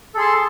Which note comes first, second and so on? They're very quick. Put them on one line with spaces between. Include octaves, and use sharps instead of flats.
A4 G#4 C6 A5